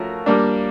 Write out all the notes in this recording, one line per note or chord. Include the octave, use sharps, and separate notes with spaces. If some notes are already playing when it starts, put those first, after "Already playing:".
Already playing: F3 A3 C#4 F#4 A#4
G3 A#3 D4